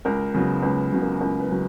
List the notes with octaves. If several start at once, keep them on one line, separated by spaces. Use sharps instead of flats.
C#2 A#4
C#3 F#3 B3
C#2 B4
C#3 F#3 B3
A#4
C#2 A#4
B4
C#3 F#3